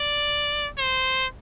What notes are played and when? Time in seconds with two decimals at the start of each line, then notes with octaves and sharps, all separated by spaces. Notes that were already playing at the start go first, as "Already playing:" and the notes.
Already playing: D5
0.78 C5